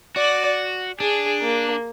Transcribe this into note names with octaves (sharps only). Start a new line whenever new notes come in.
F#4 D5
D4 G#4
A#3